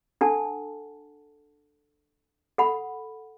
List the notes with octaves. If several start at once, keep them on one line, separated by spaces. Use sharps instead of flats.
D4 A4 F#5 A5
A4 F#5 B5